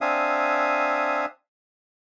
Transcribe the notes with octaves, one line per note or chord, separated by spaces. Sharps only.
C4 D4 E5 F5 G#5 D#6